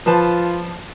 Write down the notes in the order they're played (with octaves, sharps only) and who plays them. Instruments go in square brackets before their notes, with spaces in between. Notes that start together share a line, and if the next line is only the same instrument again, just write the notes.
[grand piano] F3 B4 A5 [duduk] F4